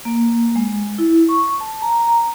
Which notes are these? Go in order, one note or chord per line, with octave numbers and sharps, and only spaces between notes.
A#3
G#3
E4
C#6
A5
A#5
A#5